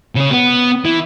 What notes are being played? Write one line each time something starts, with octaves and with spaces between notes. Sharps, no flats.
C#3 C#4
B3
E3